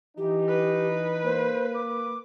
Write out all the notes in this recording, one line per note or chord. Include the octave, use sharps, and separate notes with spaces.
E3 D#4 G4
B4
A#3 C5
D6